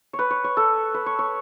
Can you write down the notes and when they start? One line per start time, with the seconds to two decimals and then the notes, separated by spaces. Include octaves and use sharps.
0.13 C#5
0.19 B4
0.30 C#5
0.44 C#5
0.57 A4
0.94 B4
1.06 C#5
1.19 C#5